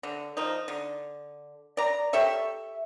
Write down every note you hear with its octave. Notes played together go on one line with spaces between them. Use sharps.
D3
F3 D#4
D3
D5 A#5
G4 A4 C#5 E5